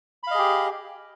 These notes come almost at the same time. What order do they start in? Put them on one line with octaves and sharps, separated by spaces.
B5 F5 D#5 G#4 G4